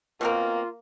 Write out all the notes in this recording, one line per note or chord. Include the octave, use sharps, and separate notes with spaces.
B2 A#3 C4 F4 A#4